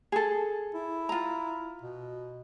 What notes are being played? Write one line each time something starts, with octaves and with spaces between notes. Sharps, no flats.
G#4 A4
E4
F4 A#5
B2